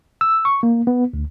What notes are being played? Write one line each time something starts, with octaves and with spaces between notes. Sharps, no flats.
E6
C#6
A#3
B3
D2